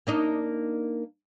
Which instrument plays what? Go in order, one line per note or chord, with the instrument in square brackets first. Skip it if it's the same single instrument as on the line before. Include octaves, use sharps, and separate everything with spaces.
[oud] A#3 D4 D#4